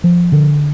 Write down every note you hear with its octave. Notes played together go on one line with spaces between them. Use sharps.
F3
D3